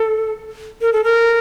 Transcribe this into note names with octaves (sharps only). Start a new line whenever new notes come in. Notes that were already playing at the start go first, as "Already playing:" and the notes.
Already playing: A4
A#4
A4
A#4